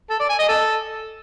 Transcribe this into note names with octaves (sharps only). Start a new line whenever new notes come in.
A4
D5
G#5
D#5
A4